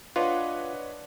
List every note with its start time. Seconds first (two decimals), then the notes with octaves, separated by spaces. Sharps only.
0.16 D4 F4 B4 C#5 D#5 F#5